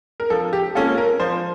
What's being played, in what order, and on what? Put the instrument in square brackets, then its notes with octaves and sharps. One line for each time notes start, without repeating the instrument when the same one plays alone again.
[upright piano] A#4
F3 A4
G4
A#3 C#4 F4 A4
A#4
F3 C5